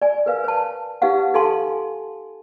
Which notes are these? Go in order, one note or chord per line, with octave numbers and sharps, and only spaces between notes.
D5 G#5
A#4 B4 F5
C5 A5
D#4 G4 B4 F5 F#5
D#4 A4 F5 G#5 A5 C6